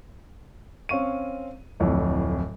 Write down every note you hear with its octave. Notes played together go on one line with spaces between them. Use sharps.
C4 C#4 F5 C#6 D#7
D1 F2 A2 C#5